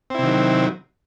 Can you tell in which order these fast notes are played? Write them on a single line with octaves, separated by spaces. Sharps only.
C4 E4 C3 D#3 F#3